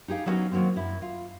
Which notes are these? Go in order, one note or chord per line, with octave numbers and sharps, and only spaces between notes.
D#4 G4 G#4 F5
F#3 G3 B3 C#4 D#4 F#4
D#3 F#3 A3 A#3 C4
F#2 E4
F4